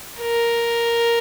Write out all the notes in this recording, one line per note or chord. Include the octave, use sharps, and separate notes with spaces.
A#4